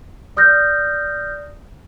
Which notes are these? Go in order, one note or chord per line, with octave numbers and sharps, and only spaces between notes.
D5 D#6 F6 G6 A#6